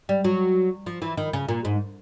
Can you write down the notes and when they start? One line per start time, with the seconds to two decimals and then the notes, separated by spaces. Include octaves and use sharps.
0.09 G3
0.24 F#3
0.86 F3
1.02 E3
1.17 D#3
1.33 C#3
1.48 A#2
1.65 G#2